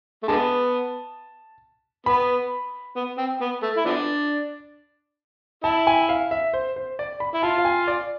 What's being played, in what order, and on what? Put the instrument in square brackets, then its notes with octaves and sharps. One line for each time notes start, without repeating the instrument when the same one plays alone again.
[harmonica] A3
[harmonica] D3 G#3 B3 [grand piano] A5
[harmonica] B3 [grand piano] B5
[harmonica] B3
C4
B3
A3
E4
F3 B3 D4
[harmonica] E4 [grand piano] A5
[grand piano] G#5
F5
E5
C5
C5
D5
B5
[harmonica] E4
[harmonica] F4 [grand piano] A5
[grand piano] F5
G#5
D5